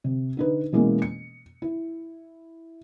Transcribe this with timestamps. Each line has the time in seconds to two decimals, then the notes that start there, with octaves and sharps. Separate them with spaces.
0.04 C3
0.37 D3 D#4 B4
0.72 B2 E3 G#3 A#3 C#4
1.02 C#7
1.62 E4